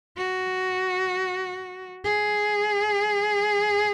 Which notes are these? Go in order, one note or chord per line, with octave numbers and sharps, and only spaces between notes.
F#4
G#4